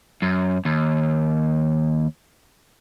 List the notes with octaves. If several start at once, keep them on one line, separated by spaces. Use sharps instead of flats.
F#2
D#2